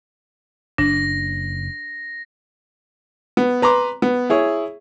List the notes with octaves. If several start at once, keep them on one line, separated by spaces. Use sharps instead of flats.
F#1 D4 A#6
B3
B4 A#5 C6 D6
B3
E4 G#4 C#5